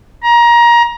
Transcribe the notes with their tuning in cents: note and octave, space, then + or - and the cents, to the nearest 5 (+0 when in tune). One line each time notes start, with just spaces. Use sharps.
A#5 +25